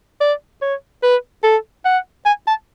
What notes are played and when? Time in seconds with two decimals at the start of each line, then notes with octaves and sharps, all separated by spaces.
0.20 D5
0.62 C#5
1.03 B4
1.43 A4
1.85 F#5
2.25 G#5
2.47 A5